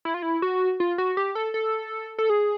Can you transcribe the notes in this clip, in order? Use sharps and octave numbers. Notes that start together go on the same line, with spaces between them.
E4
F4
E4
F#4
F4
F#4
G4
A4
A4
A4
G#4